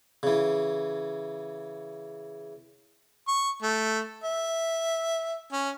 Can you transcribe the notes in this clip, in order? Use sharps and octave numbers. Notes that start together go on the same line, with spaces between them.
C#3 E3
C#6
A3
E5
C#4